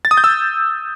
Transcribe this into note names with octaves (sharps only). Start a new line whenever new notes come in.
A6
D#6
G6
E6